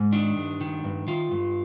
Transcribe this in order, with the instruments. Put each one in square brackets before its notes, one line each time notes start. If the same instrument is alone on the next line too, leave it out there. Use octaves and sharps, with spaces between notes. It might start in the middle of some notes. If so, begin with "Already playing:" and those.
Already playing: [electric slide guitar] G#2
D#3 D4
G2
D#3
G2
D#3 F4
G2